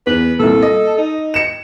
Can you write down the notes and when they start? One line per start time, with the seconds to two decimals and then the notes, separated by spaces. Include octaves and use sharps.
0.07 E2 B4
0.40 C2 A#2 A4
0.62 D#5
0.98 D#4
1.34 C#7 E7